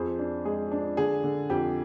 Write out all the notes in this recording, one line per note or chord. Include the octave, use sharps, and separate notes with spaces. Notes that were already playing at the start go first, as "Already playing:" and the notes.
Already playing: F2 G#4 C5
D4
G#3 G#4
D4
D3 G#4
D3
F2 G4